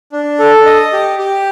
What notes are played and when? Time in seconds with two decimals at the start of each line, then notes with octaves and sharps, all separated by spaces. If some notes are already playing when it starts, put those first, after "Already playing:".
0.12 D4
0.39 A4
0.66 D#5
0.93 G4
1.19 G4